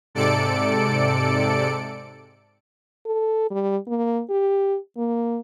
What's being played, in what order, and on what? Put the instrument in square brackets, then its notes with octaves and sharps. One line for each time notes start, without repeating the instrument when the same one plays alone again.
[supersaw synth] G#2 C3 A4 D5 C#7 D7
[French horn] A4
G3
A#3
G4
A#3